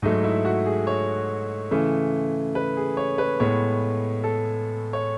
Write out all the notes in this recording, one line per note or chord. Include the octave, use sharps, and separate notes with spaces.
G#2 F#3 A3 D#4
E4
F#4
G#4
C#5
C#3 E3 A3
B4
G#4
C#5
B4
A2 G#3 B3 C#5
A4
C#5